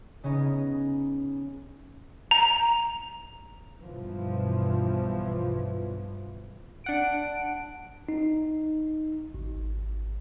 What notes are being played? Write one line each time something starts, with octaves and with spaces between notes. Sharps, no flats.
C#3 B3 C#4 D#4
A#5
B1 G2 B2 E3 F3
D4 F#5 D7
D#4
G#1